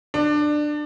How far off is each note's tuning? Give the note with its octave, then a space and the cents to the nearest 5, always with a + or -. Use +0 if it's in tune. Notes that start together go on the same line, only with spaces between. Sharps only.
D4 +20